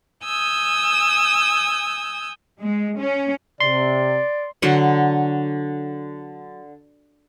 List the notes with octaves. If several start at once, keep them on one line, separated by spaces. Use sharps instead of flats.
G#5 D#6 E6 G6
G#3
C#4
C3 D5 C6
D3 F#3 F#5 C6